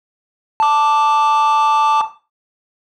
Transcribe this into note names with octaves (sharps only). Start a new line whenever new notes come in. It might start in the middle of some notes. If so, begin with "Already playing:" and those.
A5 D6